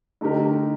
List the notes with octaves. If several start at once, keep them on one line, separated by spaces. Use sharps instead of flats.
D3 A3 D#4 G4 A#4